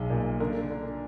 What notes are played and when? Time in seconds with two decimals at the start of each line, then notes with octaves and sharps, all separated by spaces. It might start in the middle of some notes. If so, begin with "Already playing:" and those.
Already playing: B1 G#3 G#4
0.10 A#2
0.40 D3 A#4
0.70 D3